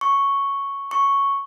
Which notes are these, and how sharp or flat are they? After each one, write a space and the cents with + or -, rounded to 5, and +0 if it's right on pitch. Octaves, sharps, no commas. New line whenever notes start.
C#6 +0
C#6 +0